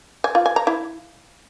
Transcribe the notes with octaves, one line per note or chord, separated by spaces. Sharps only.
G#5
F4
G#5
A#5
E4